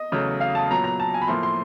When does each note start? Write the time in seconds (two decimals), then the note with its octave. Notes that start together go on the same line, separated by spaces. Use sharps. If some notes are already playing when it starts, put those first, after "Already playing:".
Already playing: D#5
0.12 E2 C#3 F#3 A3
0.41 F5
0.55 A5
0.70 A#2 F#3 B3 A#5
0.84 A#5
1.00 A5
1.14 G#5
1.22 B5
1.28 A2 F3 A#3 C6
1.43 C6